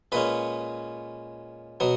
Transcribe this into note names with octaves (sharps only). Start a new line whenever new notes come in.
A#2 G#3 C#4 B4
B2 F#3 B3